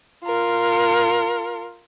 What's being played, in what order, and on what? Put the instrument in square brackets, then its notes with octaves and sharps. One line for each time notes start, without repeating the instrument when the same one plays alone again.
[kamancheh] F4 A#4